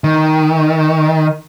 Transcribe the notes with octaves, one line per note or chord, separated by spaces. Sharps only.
D#3